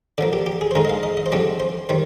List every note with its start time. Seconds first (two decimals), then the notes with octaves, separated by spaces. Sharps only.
0.18 D3 F3 A#3 D5
0.33 G4
0.46 G4
0.61 G#4
0.71 C5
0.75 D3 G#3 D#4 A#4
0.85 D#5
0.90 F5
1.03 D#5
1.17 D#5
1.26 C5
1.32 F2 D3 G3 D4 D5
1.60 C5
1.89 D#3 G3 C5